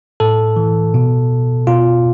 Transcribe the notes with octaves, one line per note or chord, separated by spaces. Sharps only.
A2 A4
E3
B2
B2 F4